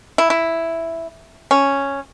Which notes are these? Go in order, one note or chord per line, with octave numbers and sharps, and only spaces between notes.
E4
E4
C#4